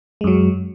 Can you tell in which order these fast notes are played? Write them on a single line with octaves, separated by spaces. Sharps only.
G#3 F#2 F#3